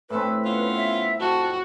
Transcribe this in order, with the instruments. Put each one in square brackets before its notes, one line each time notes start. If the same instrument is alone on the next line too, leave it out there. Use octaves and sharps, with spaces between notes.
[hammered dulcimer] A2 C4 [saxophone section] D4 E4 A4 [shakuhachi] B4
[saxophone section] B3 C#4 F4
[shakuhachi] E5
[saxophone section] F2 [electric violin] F#4 [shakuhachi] A5